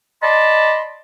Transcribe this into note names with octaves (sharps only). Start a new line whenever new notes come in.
D5 D#5 A5 B5 C6